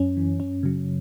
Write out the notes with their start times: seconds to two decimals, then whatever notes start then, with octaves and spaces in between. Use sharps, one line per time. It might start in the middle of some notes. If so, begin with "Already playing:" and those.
Already playing: F#2 C#4
0.17 E3
0.40 F#2 C#4
0.63 C#3 F#3